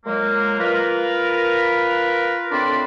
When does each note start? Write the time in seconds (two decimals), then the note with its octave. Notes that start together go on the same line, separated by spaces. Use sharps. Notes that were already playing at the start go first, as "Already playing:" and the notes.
0.05 A#2 F#3 G#3 A#3
0.59 F4 A#4 B4
2.52 A2 C4 D4 D5 B5 C6